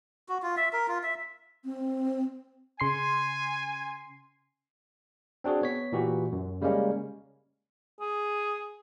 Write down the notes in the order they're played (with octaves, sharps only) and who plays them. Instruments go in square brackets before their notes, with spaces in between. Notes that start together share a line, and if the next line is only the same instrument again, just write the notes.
[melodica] F#4
F4
E5
A#4
F4
E5
[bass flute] C4
[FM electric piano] C#3 C6 C7 [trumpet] G#5
[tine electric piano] C4 D4 F#4 G#4
B3 C#5 B6
A#2 E3 F#4 G4
F#2
C#3 G3 G#3 A#3 C#4
[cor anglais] G#4